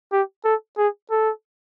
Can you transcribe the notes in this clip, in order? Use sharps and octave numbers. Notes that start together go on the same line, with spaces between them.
G4
A4
G#4
A4